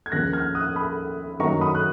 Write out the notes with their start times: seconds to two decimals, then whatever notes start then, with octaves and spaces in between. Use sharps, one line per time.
0.06 G#6
0.12 D#2 C#3 F3 A#3 F#6 A#6
0.33 F6 G#6
0.55 D#6 F#6
0.76 B5 D#6
1.39 F#2 D#3 F#3 A#3 A#5 C#6
1.61 B5 D#6
1.75 F#6